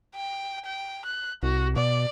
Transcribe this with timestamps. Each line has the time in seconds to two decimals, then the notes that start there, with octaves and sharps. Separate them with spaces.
0.15 G5
0.65 G5
1.05 F#6
1.43 C2 F#4
1.76 B2 D5